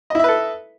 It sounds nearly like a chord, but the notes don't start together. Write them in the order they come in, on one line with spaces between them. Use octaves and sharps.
D#5 E4 E5 B4 A4